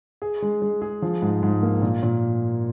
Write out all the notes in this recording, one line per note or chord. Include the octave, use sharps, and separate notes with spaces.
G#4
G#3
G#3
G#4
F3
G#2
G#2
A#3
A#2
A#2